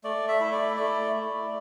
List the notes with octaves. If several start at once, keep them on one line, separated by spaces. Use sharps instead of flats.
A3 D5
E5
E4
D5
E5
A3 D5
A3